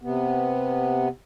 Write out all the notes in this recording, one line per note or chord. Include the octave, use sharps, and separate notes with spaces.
C3 B3